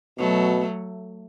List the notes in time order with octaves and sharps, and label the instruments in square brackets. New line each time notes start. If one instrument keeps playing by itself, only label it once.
[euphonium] B2 [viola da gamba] F#3 A3